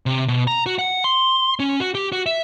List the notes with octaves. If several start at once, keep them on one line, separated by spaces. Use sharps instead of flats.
C3
B2
A#5
F#4
F#5
C6
C#4
F#4
G4
F#4
E5